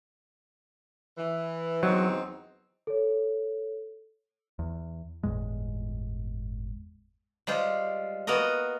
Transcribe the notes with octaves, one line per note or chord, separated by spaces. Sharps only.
E3
E2 F#3 C4 D#4
A4 C#5
E2
G1 E2 A2 G#3
G3 G#3 F4 C5
A#3 B3 F#4 A#4 D#5